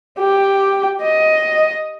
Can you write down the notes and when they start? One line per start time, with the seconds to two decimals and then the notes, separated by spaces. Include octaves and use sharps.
0.18 G4
1.02 D#5